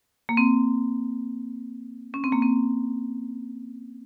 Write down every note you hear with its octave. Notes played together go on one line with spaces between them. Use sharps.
A#3
C4
C#4
C4
A#3
C4